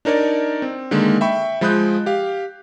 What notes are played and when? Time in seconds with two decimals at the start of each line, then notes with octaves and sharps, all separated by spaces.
0.05 D4 D#4 A#4 C#5 D5
0.62 C4
0.91 D3 D#3 G#3 A#3
1.21 E5 G5 B5 C#6
1.61 F3 G#3 B5 D#6 F#6 G6
2.06 G4 F5